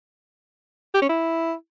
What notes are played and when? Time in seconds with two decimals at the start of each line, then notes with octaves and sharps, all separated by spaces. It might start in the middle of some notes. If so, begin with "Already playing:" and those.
0.95 G4
1.02 C#4
1.10 E4